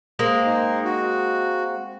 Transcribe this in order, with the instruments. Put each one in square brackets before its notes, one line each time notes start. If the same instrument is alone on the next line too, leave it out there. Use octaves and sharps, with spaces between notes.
[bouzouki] G#3 A#3 C4
[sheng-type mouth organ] D#4
F#4